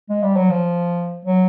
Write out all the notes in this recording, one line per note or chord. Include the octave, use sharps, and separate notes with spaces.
G#3
G3
F#3
F3
F#3